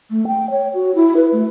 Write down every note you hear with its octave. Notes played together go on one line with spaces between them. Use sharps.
A3
G5
C#5
F#4
E4
B4
A3